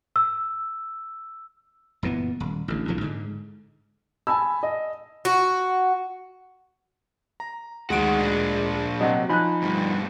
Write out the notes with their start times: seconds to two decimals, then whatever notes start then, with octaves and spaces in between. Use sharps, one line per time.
0.16 E6
2.03 F#1 A#2 E3 B3
2.40 D#1
2.68 A1 D3
2.88 A#1 E2 D3 F3
3.01 G#2 D3
4.27 G#5 A5 B5 E6
4.63 D#5
5.25 F#4
7.40 A#5
7.90 D2 D#3 G#3 F#4 D7
8.20 A#2 D4
9.01 C3 F#3 D#5 F#5
9.29 F3 D#4 G#5 B5 F#6
9.62 D2 G2